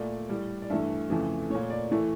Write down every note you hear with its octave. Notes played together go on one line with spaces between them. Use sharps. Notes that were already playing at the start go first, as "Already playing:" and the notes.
Already playing: A#2 A3 D5
A2 G3
D5
G2 E3 A3 E5
F2 C#3 E3 A3
A#2 A3 C#5
D5
A2 E3 A3